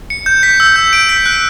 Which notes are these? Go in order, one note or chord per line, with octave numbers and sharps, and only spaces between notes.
C#7
G6
B6
E6
G6
D7
B6
F#6